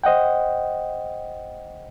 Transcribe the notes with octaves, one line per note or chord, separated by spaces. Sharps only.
C5 D#5 F#5 G5